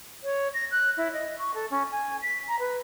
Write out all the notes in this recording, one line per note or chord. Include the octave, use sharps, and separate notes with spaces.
C#5
A#6
F#6
E4
D#5
C#6
A4
C#4
G#5
B6
A#5
B4